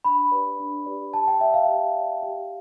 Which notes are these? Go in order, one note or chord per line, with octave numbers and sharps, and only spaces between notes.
D4 B5
G4 B4 D5
D4
G4 B4 D5
G4 A5
G5
D5 E5
F5
G4
D5
G4